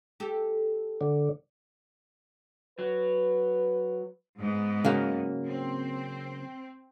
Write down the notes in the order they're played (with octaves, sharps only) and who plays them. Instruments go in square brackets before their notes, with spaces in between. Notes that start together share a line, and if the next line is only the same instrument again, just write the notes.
[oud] G4 A4
[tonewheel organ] D3
[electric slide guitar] F#3 [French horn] B4
[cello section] G#2 B3
[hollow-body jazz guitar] C#3 F#3 A#3
[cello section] C4